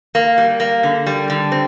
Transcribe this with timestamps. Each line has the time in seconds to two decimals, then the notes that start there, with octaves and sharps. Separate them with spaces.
0.15 A#3
0.38 G3
0.60 A#3
0.83 D3
1.07 G3
1.30 D3
1.52 C4